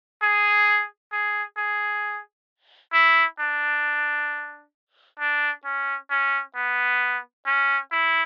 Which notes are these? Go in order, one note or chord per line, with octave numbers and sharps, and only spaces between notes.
G#4
G#4
G#4
E4
D4
D4
C#4
C#4
B3
C#4
E4